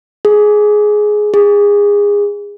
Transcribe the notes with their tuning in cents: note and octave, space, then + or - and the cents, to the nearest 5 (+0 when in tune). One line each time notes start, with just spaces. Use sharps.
G#4 +10
G#4 -25